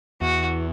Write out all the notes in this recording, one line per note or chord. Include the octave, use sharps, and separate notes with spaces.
E2 F#4